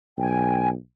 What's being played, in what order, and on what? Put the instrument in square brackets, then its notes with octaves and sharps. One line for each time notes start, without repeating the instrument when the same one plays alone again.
[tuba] B1 [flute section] G5 G#5